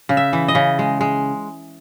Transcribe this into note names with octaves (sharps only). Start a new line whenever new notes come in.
C#3
E5
E3
D#5
C#3
G#3
G#3